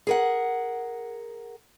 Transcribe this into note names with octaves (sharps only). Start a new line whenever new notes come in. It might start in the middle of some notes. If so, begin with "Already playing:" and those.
G#4 A#4 F#5